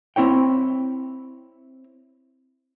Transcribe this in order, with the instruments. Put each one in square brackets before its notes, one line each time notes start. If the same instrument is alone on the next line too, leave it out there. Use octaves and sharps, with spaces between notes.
[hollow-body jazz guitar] C4 E4 C#5 G5